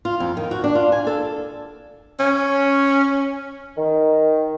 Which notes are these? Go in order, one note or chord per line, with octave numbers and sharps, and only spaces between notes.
F4
F2
D#3
F#4
D4
F4
G#5
A4
C#4
D#3